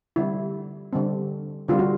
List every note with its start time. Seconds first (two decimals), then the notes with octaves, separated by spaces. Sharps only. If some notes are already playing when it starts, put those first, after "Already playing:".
0.16 D3 G3 C4 E4
0.93 D3 G3 C4
1.68 D3 G3 C4 F4
1.79 F#4